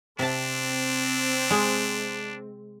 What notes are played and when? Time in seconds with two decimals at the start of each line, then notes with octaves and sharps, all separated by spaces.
0.19 C3 C4 D4 A5
1.51 G#3